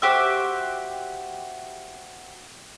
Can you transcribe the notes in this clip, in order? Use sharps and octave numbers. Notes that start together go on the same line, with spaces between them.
F#4 G4 C5 E5